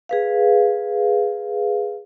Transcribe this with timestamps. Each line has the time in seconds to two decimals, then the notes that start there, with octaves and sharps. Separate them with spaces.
0.09 G#4 B4 F5